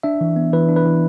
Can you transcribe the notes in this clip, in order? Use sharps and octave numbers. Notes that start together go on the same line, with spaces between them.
D4 E5
E3
B3
E3 B4
D4
B4
E3